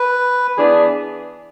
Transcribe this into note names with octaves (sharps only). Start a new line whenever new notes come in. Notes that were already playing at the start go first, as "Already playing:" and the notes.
Already playing: B4
E3 B3 D4 G#4